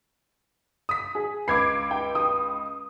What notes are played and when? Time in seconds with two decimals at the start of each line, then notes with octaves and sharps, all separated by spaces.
0.89 D#6 B6
1.15 G#4
1.48 C#2 B5 D6 G#6 C7
1.91 G5
2.15 D#6